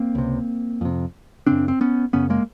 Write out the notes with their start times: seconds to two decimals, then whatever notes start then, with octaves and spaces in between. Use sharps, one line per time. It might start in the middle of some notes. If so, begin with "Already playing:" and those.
Already playing: A#3 C4
0.15 C#2 C3
0.81 F2 C3
1.47 F#2 C#3 C4 D4
1.68 C4
1.81 B3 C#4
2.13 F#2 C#3 B3 C#4
2.30 G#3 A#3